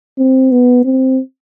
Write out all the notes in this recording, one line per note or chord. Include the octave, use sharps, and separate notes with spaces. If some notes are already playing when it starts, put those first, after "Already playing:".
C4
B3
C4